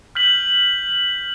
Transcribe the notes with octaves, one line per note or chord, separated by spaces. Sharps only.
F6 G6 B6 F#7